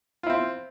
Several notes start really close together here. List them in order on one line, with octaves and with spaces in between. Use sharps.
F4 E4 C4